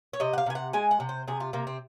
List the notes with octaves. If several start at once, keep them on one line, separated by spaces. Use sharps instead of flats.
C#5
C3 D#5
F#5
F5
C3 G#5
F#5
G#3 G#5
F#5
C3
C5
C3 G#4
F4
C3 A#3
C4